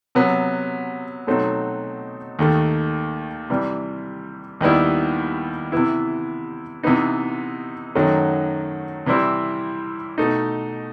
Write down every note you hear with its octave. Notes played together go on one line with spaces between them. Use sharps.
C3 F#3 B3
B2 F#3 A3 C4 D#4
D#2 D#3 A3
C3 E3 G3
D#2 D#3 G3 B3 E4
C3 E3 B3 E4
C3 E3 B3 D#4
F#2 D#3 F#3 A3
C3 E3 G3 C4 E4
B2 A3 D#4